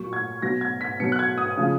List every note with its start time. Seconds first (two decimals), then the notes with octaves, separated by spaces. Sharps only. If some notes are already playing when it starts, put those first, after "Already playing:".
Already playing: A#2 F#3 C#6
0.13 G#6
0.42 B2 F#3 A#6
0.61 G#6
0.81 B6
1.00 B2 F#3 C#7
1.12 F#6
1.19 G#6
1.38 D#6
1.57 C#3 F3 G#3